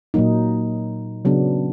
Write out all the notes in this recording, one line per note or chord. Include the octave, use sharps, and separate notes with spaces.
A#2 F#3 A#3 D#4
C#3 F#3 B3 D4